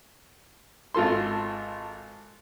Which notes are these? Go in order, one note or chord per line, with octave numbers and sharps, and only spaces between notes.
G#1 F4 A4 C6